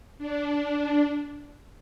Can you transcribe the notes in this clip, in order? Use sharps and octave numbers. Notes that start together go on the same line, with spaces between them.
D4